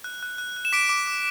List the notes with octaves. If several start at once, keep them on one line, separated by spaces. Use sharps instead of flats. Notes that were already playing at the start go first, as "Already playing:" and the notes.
F#6
F#6
F#6
F#6
E7
D6 B6 D7
D6
D6